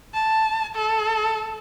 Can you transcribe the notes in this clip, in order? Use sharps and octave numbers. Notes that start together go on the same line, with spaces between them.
A5
A4